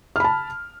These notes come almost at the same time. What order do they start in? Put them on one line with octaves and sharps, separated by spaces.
F6 B5 A5